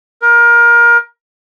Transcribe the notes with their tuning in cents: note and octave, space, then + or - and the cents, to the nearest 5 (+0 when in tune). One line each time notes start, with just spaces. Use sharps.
A#4 +25